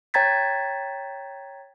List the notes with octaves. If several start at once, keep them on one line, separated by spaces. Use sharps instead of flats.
C#5 G5 A#5 G#6 A6 B6